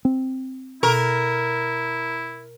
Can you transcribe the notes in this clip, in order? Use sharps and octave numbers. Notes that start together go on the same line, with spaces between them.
C4
B2 E4 A#4